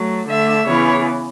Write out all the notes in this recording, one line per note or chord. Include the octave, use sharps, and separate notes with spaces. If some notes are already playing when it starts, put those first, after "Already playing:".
Already playing: F#3 A3
D3 A3 E5
C#3 E3 B3 C#5